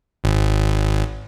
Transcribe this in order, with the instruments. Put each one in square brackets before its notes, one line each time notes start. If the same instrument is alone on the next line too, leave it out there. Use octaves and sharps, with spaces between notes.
[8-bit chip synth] G#1